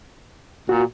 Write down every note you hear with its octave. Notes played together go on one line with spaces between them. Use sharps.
A#2 F#4